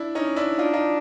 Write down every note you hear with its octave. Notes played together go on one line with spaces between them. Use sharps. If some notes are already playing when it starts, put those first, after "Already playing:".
Already playing: D4 E4
C#4 D#4
D4 E4
D4 D#4 F4
D#4 F4